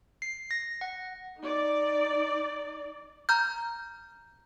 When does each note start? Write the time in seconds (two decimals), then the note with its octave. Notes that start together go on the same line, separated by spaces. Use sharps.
0.22 C7
0.51 A#6
0.81 F#5
1.38 D#4 D5
3.29 A#5 F6 G6